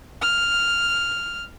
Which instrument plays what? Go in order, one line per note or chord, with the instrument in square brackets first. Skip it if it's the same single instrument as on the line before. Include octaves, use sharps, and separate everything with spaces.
[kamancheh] F6